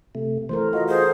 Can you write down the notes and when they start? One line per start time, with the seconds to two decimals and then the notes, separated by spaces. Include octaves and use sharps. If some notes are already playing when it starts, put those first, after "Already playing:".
0.15 C3 A3
0.49 E3 A3 A#4 C5
0.73 F4 F#4 D#5
0.89 G#4 C5